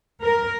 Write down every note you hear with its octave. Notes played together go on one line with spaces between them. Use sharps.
A#4